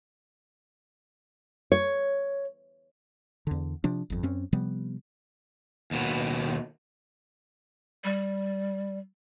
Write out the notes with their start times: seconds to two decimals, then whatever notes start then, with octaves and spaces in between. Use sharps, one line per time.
1.72 C#5
3.47 E2 D3
3.84 C3 F3 D4
4.10 G1 F2
4.23 F#2 C4 C#4
4.53 C3 F3 G3 B3
5.91 D#2 B2
8.04 G3